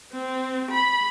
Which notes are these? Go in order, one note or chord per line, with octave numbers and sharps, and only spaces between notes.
C4
B5